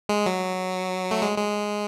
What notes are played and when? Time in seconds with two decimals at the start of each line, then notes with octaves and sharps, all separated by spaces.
0.09 G#3
0.26 F#3
1.11 A3
1.22 G#3
1.38 G#3